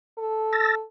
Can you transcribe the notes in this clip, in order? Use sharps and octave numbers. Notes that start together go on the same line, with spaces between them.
A4
E6 A6 A#6